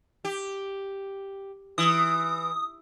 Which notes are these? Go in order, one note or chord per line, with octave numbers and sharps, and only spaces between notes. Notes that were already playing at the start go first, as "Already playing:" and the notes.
G4
E3 D#6